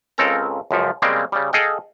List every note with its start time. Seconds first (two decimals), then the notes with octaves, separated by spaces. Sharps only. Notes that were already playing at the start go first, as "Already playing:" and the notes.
0.18 C#2 C#3 C4 A4 A#4 A#5
0.71 C#2 F#2 F3
1.02 C#3 G3 G#3 A#3 C4
1.32 C#3 G3
1.53 G#4 A4 D#5 F5 G5